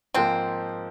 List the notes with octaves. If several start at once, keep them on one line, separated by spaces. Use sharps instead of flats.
G#2 F3 G#3 A#3 C4